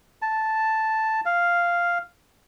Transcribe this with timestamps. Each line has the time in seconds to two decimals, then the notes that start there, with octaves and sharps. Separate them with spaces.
0.22 A5
1.26 F5